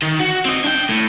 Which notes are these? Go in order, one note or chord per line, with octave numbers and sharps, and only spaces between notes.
D#3
F#4
C4 D#5
D4 G5
A2